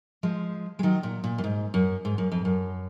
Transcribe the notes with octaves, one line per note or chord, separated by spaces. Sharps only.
F3 G#3
G#3
D#3 F#3
A#2
A#2
F#2
G#2
F#2
G#2
F#2
F2
F#2